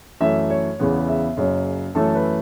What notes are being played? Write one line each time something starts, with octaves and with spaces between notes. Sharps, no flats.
F#2 E3 A3 E5
C#5
E2 C#3 E3 B3
E5
F#1 F#2 C#3
F#2 E3 A3 A4
B4